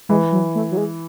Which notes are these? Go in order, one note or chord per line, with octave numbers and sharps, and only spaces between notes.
E3 G#3
F#3
A3
F#3
G#3